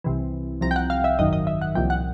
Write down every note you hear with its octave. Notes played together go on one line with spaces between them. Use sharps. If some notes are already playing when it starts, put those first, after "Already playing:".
C2 C3 E3
C2 C3 F3 A#5
G5
F#5
F5
E5
G#1 F#2 D#3 D#5
D#5
E5
F#5
C2 A#2 F3 G5
F#5